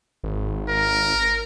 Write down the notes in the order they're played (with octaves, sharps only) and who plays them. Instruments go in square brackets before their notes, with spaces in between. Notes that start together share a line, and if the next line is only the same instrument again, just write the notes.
[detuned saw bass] G#1
[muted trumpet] A#4